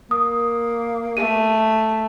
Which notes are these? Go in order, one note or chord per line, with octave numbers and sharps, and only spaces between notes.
A#3 D#6
A3 D#7